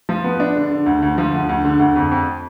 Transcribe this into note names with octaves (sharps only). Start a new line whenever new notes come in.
F3
B3
D4
D3
D3
D2
D2
F3
D2
D2
D3
D2
F2
F2